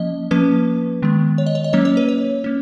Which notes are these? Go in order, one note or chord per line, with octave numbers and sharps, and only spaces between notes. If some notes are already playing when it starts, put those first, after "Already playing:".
Already playing: F3 A#3 C#4 D#5
F3 A#3 C#4 B4
D#3 G#3 B3
C#5
D#5
C#5
D#5
F#3 A#3 C#4 C#5
C#5
B4
C#5
A#3 C#4